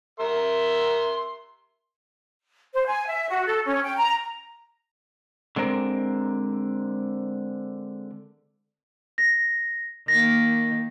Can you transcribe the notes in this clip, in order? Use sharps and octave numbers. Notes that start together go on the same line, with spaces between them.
A#4 E5 C6
C5
G#5
E5
F#4
A4
C#4
G5
A#5
D3 G#3 C4 A#4
A#6
D#3 A#3 A#6